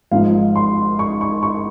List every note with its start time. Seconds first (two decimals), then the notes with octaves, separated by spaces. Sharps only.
0.12 G#1 G#2 F3 F5
0.56 C6
0.99 C#6
1.21 C#6
1.43 C#6